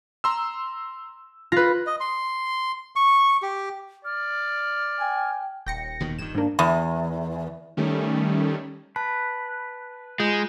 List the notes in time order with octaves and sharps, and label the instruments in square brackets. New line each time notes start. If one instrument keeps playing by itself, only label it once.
[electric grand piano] A#5 C6 E6
[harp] F4 B4 [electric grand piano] A#6
[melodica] D#5
C6
C#6
G4
[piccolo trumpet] D5 [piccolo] F6
[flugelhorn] G5 [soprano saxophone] G#5
[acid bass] D#1 [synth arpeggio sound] G5 A#6 C#7
[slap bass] D#2 B2 D#3
[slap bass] G2 D#3 [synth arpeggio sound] E7
[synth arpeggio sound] G#2 A#3 [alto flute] D4
[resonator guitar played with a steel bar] E2
[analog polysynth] D#3 G3 A3 C#4
[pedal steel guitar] B4 [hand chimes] A5
[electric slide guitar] G#3 [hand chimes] F4 G6